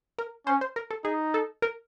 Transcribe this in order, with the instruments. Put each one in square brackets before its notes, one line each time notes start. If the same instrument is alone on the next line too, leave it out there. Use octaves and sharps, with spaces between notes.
[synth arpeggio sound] A#4
[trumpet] C#4 [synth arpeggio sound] C5
[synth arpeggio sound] C5
A#4
A4
[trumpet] D#4 [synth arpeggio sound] G#4
[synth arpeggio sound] A4
A#4